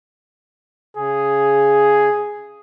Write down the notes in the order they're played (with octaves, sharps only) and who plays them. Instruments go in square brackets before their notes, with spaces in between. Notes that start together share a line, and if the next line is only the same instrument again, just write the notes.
[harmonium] C#3 [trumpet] G#4